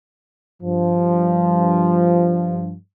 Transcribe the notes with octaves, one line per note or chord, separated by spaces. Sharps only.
G2 F3